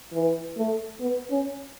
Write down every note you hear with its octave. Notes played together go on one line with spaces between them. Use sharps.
E3
A3
B3
C#4